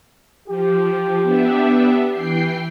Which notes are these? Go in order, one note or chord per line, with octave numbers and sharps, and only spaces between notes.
F3 G4
B3 D4 E5
E3 G5 C7